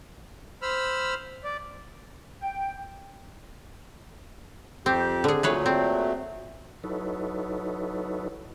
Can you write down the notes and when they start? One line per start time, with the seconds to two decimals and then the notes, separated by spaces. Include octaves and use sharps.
0.62 C5 B5 E6 F6
1.44 D5
2.43 G5
4.86 F2 C4 G4
5.24 D3 G#4
5.43 A#2 F#3 A3 G#4 B4 C#5
5.66 C4
6.84 F#3 D#4 E4 A4 B4 C#5